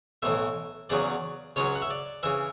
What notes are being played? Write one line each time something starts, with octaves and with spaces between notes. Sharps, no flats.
B1 A2 E3 E5
E2 C#3 F#3 D5
C#2 C#3 F#3 C#5
F#5
E5
D5
C#3 E3 E5